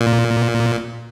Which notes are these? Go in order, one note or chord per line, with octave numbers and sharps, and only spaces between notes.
A#2